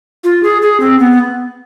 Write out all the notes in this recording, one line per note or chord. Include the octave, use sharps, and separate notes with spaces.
F4
G#4
G#4
C4
B3